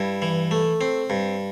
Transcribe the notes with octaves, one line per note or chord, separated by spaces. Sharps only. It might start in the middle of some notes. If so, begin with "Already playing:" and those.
Already playing: G2 E4
E3
A3
C4
G2